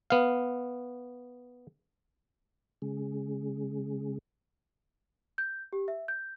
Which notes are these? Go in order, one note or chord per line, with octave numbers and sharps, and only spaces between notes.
B3 F5
C#3 G#3
G6
G4
E5
G6